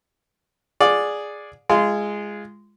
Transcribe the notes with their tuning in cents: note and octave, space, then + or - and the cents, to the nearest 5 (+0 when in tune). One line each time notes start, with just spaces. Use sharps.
G#4 +0 D5 +0 F5 +45
G#3 -5 F4 -25